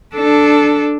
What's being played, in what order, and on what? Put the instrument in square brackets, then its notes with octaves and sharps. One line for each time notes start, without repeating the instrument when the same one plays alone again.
[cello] D4 A4